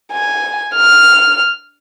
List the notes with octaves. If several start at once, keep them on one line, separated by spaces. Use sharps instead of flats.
G#5
F6